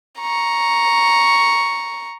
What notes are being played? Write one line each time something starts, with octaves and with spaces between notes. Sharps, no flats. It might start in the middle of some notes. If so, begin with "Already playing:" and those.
A#5 C#6